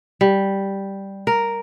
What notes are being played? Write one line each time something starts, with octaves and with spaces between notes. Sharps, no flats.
G3
A#4